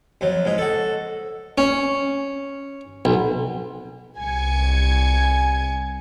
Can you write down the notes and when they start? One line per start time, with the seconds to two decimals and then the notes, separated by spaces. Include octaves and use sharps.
0.21 F2 F#3
0.45 G#2 D#4
0.58 F#4 A4
1.58 C#4
3.05 B1
4.19 C2 G#5 G#6 C#7